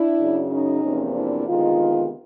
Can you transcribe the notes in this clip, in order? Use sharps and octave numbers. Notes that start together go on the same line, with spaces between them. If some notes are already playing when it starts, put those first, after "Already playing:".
Already playing: D4 E4
F#2 C#3 F#3
C#4 D#4
E2 C3 F3 A#3
D4 E4
D2 C3 D#3 G#3 B3 D#4 F4